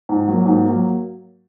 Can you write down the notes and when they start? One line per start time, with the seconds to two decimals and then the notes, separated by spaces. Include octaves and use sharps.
0.09 G#2
0.27 F#3 A#3
0.46 G#2
0.65 F#3 A#3